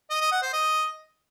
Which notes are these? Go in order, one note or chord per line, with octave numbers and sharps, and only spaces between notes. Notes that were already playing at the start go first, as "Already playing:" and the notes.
D#5
D#5
F#5
C5
D#5